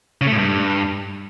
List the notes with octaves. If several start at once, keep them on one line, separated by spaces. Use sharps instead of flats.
C#3
A3
A2
G2